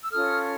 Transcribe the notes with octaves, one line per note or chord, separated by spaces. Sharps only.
E6
C#4 F4 A4 D#6 F6